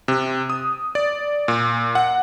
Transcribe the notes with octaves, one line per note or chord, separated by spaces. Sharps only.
C3
D#6
D5
A#2
F#5